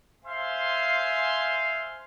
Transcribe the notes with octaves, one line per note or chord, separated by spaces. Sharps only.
C5 E5 F5 G#5 C6